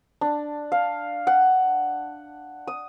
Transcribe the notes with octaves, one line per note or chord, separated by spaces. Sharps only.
D4
F5
F#5
D#6